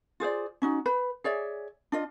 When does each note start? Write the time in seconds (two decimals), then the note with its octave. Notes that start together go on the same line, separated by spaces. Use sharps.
0.20 F4 G#4 C5 D5
0.62 C#4 D#4 F#4
0.86 B4 B5
1.24 G#4 C#5 D5 E5
1.92 D4 F4 D#5